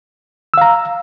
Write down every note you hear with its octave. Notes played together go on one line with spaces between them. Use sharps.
F5 A#5 E6